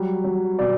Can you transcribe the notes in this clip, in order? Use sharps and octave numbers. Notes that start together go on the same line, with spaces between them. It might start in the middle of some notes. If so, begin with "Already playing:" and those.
Already playing: F#3 G3
F#3
B2 D5